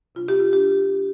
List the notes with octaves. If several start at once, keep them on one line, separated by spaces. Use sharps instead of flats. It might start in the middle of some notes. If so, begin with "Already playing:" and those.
C3 G3 D4 F4
G4
F4
D4 G4